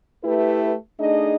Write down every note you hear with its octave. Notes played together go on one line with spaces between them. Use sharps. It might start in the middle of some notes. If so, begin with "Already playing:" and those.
A3 E4 G4 B4
A3 D4 D#4 G#4 D#5